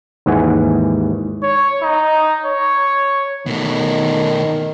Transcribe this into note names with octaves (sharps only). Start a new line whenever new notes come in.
D#2 G#2 E3 F#5 G#5
C#5
D#4
C#5
B2 D#3 A3